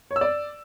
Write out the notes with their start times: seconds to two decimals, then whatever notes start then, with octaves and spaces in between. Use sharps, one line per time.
0.11 C#5
0.16 E6
0.21 D5